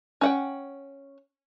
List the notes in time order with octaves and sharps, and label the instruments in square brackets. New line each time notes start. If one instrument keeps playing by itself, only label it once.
[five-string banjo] C#4 F#5 G5